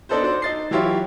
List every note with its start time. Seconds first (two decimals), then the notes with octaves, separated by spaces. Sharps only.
0.09 B3 D4 D#4 A4 B4 C5
0.23 F#4 C5 D5
0.42 D#4 A6 C7
0.71 E3 F#3 E4 F4 G4 C#5